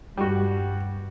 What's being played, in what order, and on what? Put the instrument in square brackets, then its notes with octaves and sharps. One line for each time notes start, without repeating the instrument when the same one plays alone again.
[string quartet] G2 [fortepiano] G3 F#4